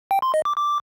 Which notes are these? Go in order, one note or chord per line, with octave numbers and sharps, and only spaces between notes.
G5
C6
D#5
D6
D6